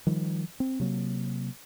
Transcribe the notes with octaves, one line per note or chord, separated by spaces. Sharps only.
D#3 F3 G3
C4
C3 F#3 A#3